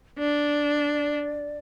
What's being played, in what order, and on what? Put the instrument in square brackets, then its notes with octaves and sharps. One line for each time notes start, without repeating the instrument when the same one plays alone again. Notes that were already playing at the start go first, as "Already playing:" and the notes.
[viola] D4 [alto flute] D5